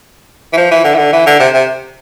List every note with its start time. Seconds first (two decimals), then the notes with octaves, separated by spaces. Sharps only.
0.53 E3
0.57 F3
0.71 E3
0.84 D3
0.94 E3
0.98 D3
1.13 E3
1.27 D3
1.40 C3
1.54 C3